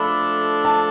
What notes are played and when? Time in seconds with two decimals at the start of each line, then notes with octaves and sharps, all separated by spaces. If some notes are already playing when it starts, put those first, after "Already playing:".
Already playing: F3 A3 D4 A4 B5
0.65 A5